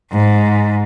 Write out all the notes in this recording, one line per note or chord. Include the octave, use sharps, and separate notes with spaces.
G#2